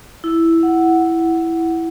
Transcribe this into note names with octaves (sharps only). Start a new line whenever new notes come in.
E4
F#5
F#5